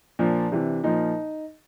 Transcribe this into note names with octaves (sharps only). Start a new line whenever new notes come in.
A#2 F3 D4
C3 E3
A#2 F3 D#4